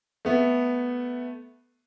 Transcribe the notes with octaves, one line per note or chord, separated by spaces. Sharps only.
A3 B3